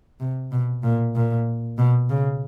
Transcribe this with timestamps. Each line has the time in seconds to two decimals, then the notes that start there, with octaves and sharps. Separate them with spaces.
0.20 C3
0.52 B2
0.83 A#2
1.15 A#2
1.78 B2
2.10 C#3